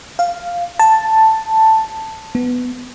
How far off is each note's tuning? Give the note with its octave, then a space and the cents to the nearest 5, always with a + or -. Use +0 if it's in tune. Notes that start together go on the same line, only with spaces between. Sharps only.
F5 -5
A5 +5
B3 +5